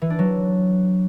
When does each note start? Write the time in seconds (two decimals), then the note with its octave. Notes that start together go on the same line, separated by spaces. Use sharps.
0.02 E3
0.10 D4
0.19 F#3